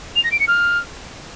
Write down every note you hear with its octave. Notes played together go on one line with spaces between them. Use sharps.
F7
A#6
D7
C#7
F6